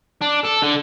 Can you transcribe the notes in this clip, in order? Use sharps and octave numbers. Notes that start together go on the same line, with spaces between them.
D4
A4
D3